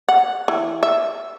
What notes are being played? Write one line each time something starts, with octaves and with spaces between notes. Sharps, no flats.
F#5
E3
E5